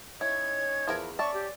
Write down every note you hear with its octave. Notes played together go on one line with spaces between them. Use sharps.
C#4 D#4 E4 C#5 G#6
E2 F3 E4 A#4
C#4 D5 E5 A5 C#6
G4